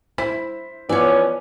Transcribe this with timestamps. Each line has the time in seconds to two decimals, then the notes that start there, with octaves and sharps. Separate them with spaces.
0.18 E4 C5 B6
0.89 E3 F3 B3 C#4 C#5 D5